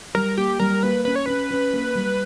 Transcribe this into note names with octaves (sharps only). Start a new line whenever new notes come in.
G3 A#4
A#3 G4
G3 A#4
A#3 B4
C#4 B4
C#5
C#4 B4
C#4
A#3
G3